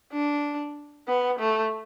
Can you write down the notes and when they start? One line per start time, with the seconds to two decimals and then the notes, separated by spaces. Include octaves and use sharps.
0.12 D4
1.08 B3
1.39 A3